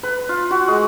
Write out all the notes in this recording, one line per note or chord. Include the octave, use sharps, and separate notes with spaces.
B4
F4
F#4
G#3